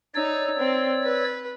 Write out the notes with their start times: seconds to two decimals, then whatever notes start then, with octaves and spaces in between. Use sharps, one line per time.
0.15 D#4 C#5 D5 E6
0.59 C4
1.03 B4